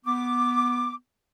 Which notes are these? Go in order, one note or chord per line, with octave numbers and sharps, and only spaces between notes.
B3 D6